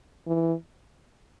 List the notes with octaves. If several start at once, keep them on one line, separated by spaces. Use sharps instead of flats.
E3